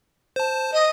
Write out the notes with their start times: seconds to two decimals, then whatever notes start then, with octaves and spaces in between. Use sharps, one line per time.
0.36 C5 A5
0.73 D#5